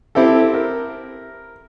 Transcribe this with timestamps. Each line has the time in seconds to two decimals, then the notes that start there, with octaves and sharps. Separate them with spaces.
0.15 C4 E4 G4 A4
0.54 A#4